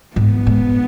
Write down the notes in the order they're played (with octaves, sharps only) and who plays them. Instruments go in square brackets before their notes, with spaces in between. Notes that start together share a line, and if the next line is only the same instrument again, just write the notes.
[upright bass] G#2 [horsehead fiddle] B3
[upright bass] G#2